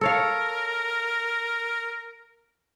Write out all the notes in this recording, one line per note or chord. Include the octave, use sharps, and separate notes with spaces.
A4 A#4 C#5 F5